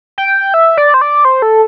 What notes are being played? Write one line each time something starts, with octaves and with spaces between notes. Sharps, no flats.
G5
E5
D5
C5
D5
C5
A4